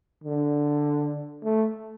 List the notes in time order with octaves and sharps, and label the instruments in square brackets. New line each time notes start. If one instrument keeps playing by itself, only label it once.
[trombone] D3
A3